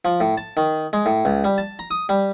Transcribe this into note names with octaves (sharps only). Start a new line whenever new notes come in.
F3
A2
A5
D#3
G#3
A2
C#2
G3
A5
A#5
D#6
G3